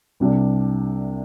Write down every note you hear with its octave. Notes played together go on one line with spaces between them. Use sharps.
C2 C3 G3 D4